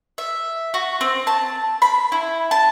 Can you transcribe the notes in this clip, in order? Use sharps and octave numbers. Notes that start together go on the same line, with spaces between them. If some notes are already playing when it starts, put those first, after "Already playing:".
E5
F#4
C4
A5
B5
E4
A5